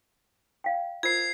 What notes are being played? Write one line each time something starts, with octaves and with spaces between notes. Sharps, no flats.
D5 F5 G5
F4 A#4 C5 G#6 C7